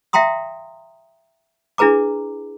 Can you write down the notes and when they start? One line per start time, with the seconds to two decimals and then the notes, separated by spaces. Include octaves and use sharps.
0.13 E5 F5 G5 A#5 C6 D#6
1.78 D4 E4 G#4 B4 A#5 D6